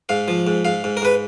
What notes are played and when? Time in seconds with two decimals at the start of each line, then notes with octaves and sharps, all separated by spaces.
0.09 G#2 F5
0.28 F3
0.47 G#2
0.65 G#2 F5
0.84 G#2
0.97 A#4
1.02 G#2 B4